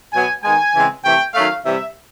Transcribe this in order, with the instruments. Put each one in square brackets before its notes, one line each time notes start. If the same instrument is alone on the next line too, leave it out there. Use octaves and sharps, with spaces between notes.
[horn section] B2 F#3 B3 G#5
D#3 G#3 B3 G#5
C#3 E3 G#3 C4
C3 E3 A3 C4 G5
D#3 F#3 A3 C#4 F5
C3 E3 G3 E5